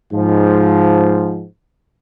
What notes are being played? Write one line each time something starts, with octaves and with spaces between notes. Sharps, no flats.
G#2 F3